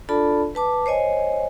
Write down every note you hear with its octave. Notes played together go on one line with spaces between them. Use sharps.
D4 F4 A4 D5 A5 B5
B4 A5 D6
C5 C#5 D#5 G#5